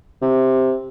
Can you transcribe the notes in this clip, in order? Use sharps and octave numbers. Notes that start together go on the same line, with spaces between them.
C3